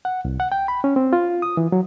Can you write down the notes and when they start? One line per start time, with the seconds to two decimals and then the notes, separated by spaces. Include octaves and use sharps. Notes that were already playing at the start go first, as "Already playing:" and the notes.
0.05 F#5
0.25 C2
0.40 F#5
0.52 G5
0.68 B5
0.84 C#4
0.96 C4
1.13 F4
1.42 D#6
1.57 E3
1.72 F#3